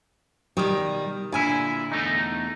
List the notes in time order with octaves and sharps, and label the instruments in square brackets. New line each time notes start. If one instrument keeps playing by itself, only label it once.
[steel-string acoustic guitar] B2 G3 [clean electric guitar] D#3
[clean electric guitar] A#2 E4 [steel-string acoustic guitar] D3 G#5
[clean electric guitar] E2 A3 D#4